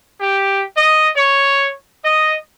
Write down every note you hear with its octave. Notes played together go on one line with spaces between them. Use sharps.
G4
D#5
C#5
D#5